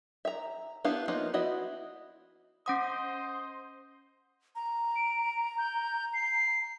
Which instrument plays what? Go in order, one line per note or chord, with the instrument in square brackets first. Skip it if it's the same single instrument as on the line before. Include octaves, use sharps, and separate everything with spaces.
[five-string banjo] E5 A#5
B3 D4 E4 G4 F5
F3 A#3 B3 C#4 D#4
B3 E4 F#4 D#5 E5
[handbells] C#4 F#5 D#6 [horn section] C5 D#5
[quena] A#5
[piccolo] D7
G6
C7